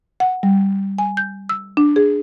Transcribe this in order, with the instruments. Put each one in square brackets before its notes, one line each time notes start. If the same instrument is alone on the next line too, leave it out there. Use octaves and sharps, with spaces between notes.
[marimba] F#5
G3
G#5
G6
E6
D4
G#4